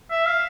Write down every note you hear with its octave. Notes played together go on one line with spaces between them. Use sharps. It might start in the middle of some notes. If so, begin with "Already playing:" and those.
E5
F5